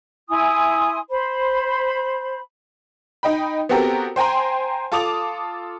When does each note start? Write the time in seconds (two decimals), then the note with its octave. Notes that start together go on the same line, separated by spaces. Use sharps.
0.29 E4 G#5 C6 D#6
1.10 C5 B5
3.23 D#4 D#5 G5 B5
3.69 B3 C4 F#4 G4 A4 A#4
4.16 C5 G5 G#5 A#5 C6
4.92 F4 A4 A5 D6 D#6 F7